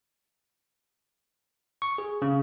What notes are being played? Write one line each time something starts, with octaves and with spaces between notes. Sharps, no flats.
C#6
G#4
C#3